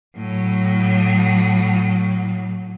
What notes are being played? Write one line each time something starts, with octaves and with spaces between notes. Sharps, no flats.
A2 F#3